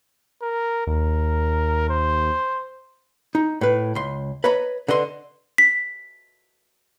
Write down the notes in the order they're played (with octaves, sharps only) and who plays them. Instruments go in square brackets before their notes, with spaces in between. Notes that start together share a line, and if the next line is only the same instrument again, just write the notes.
[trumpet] A#4
[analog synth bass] D#2 [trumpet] A#4
[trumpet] C5
[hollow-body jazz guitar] D#4
A2 B4
C#2 C6
B4 C#5 D#5 A#5 B5
D3 B4 D#5 C6
[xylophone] B6